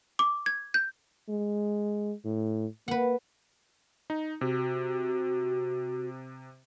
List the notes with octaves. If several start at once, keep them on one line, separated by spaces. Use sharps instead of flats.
D6
G#6
G6
G#3
A2
A#3 B4 F#5
D#4
C3 F#4